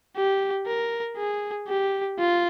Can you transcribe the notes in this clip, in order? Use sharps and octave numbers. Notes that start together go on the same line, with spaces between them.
G4
A#4
G#4
G4
F4